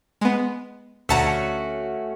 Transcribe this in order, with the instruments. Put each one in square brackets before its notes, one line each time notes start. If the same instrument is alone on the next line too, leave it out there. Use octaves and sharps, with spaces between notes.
[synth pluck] G#3 B3
[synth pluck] D2 A5 A#5 [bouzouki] A3 C#4 F#4